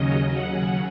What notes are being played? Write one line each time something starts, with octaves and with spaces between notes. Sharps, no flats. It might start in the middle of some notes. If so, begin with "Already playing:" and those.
Already playing: D#2 C#3 F#3 C#4 D#5
F#5